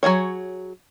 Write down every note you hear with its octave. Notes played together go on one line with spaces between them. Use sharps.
F#3 A3 G#4 C#5